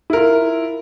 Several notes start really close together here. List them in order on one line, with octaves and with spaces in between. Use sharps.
E4 A#4 F4